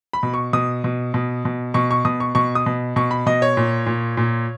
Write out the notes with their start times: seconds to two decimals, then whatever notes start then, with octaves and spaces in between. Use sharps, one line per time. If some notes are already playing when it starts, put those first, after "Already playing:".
0.13 B5
0.23 B2
0.34 C#6
0.53 B2 D#6
0.84 B2
1.14 B2
1.45 B2
1.74 B2 C#6
1.91 C#6
2.05 B2 D#6
2.20 C#6
2.35 B2 C#6
2.55 D#6
2.66 B2
2.96 B2 C#6
3.11 B5
3.26 B2 D#5
3.42 C#5
3.57 A#2
3.86 A#2
4.17 A#2